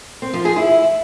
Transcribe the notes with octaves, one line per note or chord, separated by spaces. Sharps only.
C4
F3
G#4
E4